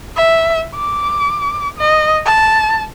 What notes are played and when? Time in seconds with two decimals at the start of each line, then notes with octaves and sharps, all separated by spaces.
0.16 E5
0.75 D6
1.78 D#5
2.25 A5